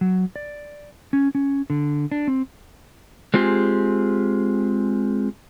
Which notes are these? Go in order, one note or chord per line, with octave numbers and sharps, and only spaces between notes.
F#3
D5
C#4
C#4
D3
D4
C4
G#3 C4 F4 G4 G#4